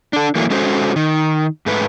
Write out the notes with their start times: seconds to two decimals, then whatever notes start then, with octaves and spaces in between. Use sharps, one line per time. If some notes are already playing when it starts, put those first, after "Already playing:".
0.13 D4 A4
0.35 E3 F#3 A3 A#3
0.50 G#3 C#4 F#4 A4 C5
0.96 D#3
1.66 G#2 A3 B4